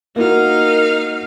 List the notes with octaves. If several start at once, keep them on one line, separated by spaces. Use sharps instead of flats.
A#3 D#4 E4 F#4 A#4 F5